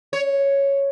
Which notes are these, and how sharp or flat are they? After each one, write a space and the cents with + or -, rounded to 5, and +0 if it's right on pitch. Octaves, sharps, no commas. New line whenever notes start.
C#5 +0